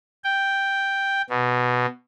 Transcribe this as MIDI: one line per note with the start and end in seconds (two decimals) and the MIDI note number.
0.24 1.22 79
1.30 1.86 47